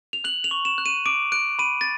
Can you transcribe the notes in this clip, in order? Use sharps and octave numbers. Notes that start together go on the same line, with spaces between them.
F7
F#6 F#7
F7
C#6
E7
F#6
D#7
D6 D7
F#6 D7
B5 D#7
A6